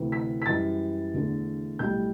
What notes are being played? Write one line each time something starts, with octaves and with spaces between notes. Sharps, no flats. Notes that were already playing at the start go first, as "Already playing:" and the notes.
Already playing: D2 C3 E3
B6
B6
F#2 E3 G3 A6
E1 E2 D3 A3
B1 A2 G3 G6